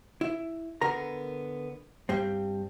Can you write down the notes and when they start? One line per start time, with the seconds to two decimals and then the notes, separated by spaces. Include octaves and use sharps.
0.21 E4
0.81 D3 B3 A#4 A#5
2.09 G2 G3 C4